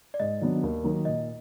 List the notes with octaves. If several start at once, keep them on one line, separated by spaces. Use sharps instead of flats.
D5
G#2 D#5
D#3 F#3 B3 D4
D#2
D#3 F#3 A#3 D#4
A#2 D#5